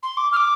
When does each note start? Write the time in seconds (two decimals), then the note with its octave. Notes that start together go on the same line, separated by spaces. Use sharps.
0.03 C6
0.17 D6
0.32 F6
0.37 D6